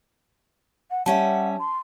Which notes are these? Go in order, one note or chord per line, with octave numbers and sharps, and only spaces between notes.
F#5
G3 C#4 E5 F#5 A5
C6